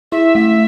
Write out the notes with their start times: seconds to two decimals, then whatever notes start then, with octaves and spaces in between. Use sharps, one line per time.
0.12 E4 E5
0.35 A3